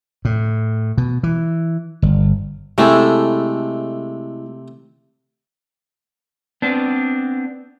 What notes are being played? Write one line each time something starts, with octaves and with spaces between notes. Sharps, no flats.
A2
B2
E3
G1
C3 G#3 A3 E4 A4
B3 C4 D4